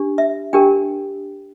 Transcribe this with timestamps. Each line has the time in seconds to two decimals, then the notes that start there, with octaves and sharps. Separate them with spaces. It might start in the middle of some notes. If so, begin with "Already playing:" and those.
Already playing: D4 G4
0.18 E5
0.53 D4 G4 A#4 G5